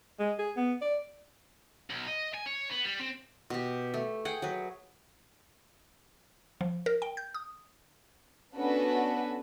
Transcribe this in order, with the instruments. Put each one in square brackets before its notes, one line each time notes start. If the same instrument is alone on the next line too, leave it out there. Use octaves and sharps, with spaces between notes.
[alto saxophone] G#3
G#4
B3
D5
[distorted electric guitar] B1
D#5
G#5
C#5
B3
G3
C4
[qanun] B2 G4
A3
G#4 F#5 G5
F#3 B4
[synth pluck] F3
A#4
G5
G6
D#6
[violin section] B3 C#4 D4 F#4 A4 B4